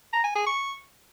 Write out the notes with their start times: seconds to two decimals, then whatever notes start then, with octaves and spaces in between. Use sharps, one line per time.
0.13 A#5
0.24 G#5
0.35 G#4
0.46 C#6